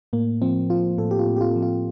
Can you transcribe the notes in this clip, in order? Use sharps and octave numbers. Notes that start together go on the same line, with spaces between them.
A2 A#3
F3 C4
F3 F4
A2 A4
G4
F4
A2
G4
F4
F3
F4